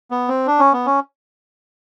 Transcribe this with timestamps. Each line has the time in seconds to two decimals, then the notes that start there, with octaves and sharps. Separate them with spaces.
0.11 B3
0.28 C4
0.47 D4
0.59 C#4
0.73 B3
0.86 C#4